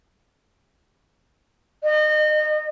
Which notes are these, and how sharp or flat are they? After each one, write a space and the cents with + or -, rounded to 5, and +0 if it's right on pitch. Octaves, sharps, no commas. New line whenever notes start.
D#5 -30